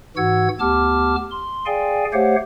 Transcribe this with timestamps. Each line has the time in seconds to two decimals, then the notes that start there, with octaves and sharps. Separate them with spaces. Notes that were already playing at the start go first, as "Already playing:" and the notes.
0.17 G#2 E3 F#4 F#5 E6 G#6
0.60 D2 B3 G4 A5 D6 F6
1.31 C6
1.66 G#4 D5 F5 G5 G#5
2.13 A3 G4 C5 C#5 F5 F#5